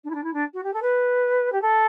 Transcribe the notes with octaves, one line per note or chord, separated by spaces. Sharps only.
D4
E4
D4
E4
D4
F#4
G4
A4
B4
G4
A4